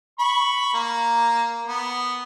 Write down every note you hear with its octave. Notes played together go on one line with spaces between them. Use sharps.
B5 C#6
A#3 A#5
B3